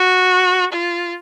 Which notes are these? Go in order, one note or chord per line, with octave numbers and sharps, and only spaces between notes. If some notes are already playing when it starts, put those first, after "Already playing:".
Already playing: F#4
F4